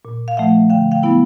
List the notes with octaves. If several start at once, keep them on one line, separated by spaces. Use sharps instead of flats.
A#2
F5
F3 A3 E5 F#5
D3 F5 G5
F5 G5
F#3 B3 E4